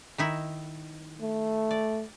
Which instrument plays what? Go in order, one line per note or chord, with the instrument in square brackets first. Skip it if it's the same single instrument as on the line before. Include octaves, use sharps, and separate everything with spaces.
[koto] D#3 D#4 E4
[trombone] A3
[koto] D5